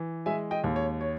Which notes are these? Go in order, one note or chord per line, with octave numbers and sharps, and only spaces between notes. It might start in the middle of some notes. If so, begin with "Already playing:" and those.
Already playing: E3
G#3 E5 G#5
D#5 G5
D#2
C#5
C#5